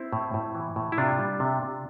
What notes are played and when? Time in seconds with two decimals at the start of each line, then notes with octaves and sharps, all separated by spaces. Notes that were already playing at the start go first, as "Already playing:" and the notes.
Already playing: C4 E4
0.13 A2
0.34 A2
0.55 E3
0.76 A2
0.92 E4
0.98 C3 D4 F4
1.19 G3
1.40 C3
1.63 C3